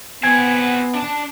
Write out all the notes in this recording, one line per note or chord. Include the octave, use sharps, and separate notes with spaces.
B3 C4 F#4 G#5 G#6
D4 A5